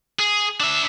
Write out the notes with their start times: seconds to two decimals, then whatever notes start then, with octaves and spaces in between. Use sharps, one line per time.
0.19 G#4
0.60 D4 E5